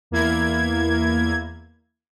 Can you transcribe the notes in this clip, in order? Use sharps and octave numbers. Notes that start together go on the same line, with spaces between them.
E2 A#3 E4 G#6